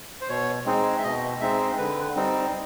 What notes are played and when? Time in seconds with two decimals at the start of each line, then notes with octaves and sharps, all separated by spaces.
0.21 C5
0.29 B2 C#5
0.66 G#3 C4 D#4
0.98 E5
1.04 B2 D#5
1.41 G#3 C4 D#4 E5
1.78 D3 B4
2.16 G3 C4 D#4